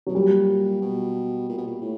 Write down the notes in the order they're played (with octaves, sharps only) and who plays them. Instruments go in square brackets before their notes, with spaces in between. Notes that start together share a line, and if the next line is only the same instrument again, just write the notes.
[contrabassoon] B2 [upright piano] F#3
[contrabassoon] A#2 [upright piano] G3
[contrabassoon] B2
A#2
B2
A#2
A2